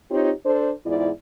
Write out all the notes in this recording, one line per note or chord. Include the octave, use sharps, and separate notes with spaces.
C4 D#4 F4 G4 C#5
D4 A4 C5
E2 G#2 E4 F4 D5